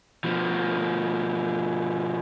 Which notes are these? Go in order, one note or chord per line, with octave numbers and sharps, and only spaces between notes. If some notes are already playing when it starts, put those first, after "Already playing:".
B2 F3